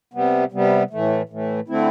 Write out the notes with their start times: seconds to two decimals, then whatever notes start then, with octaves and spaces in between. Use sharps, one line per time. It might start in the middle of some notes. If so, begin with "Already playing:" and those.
0.14 C3 G3 B3
0.52 C3 G3 B3
0.91 A2 E3 A3
1.29 A2 E3 A3
1.68 D3 A3 C4 E4